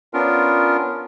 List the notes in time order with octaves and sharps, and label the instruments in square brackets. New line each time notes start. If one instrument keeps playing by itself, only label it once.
[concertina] B3 C#4 D4 F4 A#4